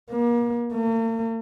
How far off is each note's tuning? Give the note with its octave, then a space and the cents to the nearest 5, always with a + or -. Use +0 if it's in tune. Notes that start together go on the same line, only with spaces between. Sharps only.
A#3 +35
A#3 -45